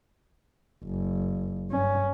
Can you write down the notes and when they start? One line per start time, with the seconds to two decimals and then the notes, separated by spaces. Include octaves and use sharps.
0.85 F#1
1.70 G2 C#4